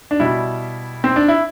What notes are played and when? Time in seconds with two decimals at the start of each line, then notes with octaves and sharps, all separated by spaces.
0.11 D4
0.20 B2 G3 E4
1.04 C4
1.16 D4
1.28 E4